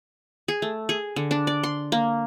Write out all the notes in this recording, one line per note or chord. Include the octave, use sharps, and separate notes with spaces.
G#4
A3
G#4
D3
D4
D5
C6
A#3